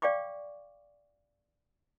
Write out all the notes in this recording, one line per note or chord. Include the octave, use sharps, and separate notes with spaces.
D5 F5 G5 C#6 D6